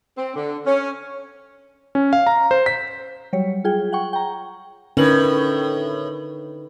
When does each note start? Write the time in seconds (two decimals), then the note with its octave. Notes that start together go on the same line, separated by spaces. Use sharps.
0.18 C4
0.36 D3
0.67 C#4
1.95 C#4
2.13 F5
2.27 A#5
2.51 C5
2.66 B6
3.33 F#3 G3 C#5
3.64 F4 G#4 G5
3.93 F#5 G5 C#6
4.13 G5 A#5
4.97 A2 D3 C#4 D#4 A#4 B4 F#7